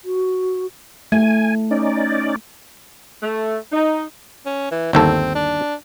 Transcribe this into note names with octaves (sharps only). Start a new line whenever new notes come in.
F#4
A3 G#5
C#4 D#4 D5
A3
D#4
C#4
E3
G1 D#2 C4 A4
D4